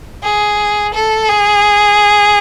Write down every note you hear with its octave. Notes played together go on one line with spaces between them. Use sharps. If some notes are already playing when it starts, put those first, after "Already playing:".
G#4
A4
G#4